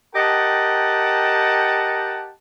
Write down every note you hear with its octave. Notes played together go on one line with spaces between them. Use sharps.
G4 A#4 D#5 F#5 G5 A5